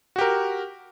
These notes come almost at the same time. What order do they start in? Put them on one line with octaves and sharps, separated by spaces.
F#4 G4 A#4